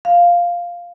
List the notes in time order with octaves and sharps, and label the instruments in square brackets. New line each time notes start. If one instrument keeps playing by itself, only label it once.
[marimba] F5